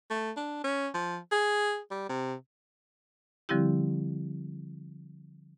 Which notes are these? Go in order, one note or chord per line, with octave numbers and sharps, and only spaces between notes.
A3
D4
C#4
F3
G#4
G3
C3
D3 F3 G3 C4 E4 G4